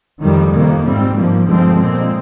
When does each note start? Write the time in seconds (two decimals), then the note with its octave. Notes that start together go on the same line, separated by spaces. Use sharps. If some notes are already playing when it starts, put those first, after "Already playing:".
0.21 F2 D#3 G3
0.53 F2 C3 D#3 A#3
0.84 G#2 G3 C4
1.16 G#2 F3 A#3
1.47 G2 D3 F3 G#3 C4
1.78 A#2 G#3 C4